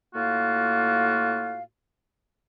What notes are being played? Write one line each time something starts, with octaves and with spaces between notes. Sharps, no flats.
A2 A#3 F4 F#4 F5